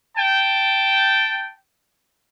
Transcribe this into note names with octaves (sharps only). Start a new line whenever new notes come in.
G5 A5